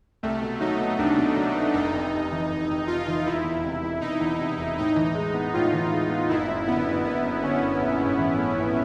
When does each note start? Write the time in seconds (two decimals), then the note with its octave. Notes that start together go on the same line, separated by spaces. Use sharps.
0.23 C2 A3
0.42 B2
0.60 F#3 D#4
0.80 B3
0.98 C2 D4
1.18 B2
1.36 F#3
1.55 B3
1.74 F1 D#4
1.93 F2
2.12 C3
2.32 E3
2.50 F1
2.70 F2
2.87 C3 F4
3.07 E3
3.26 E1 E4
3.44 E2
3.64 C3
3.83 E1
4.01 E1 D#4
4.20 E2
4.39 C3
4.59 E1
4.78 A2 D#4
4.96 E3
5.15 G#3
5.34 B3
5.54 A2 F4
5.73 E3
5.92 G#3
6.10 B3
6.29 F#1 E4
6.48 F#2
6.68 D3 B3
6.86 F#1
7.05 F#1 B3
7.24 F#2
7.43 D3 C#4
7.61 F#1
7.81 A#1
8.00 G#2
8.18 E3
8.38 A3
8.57 A#1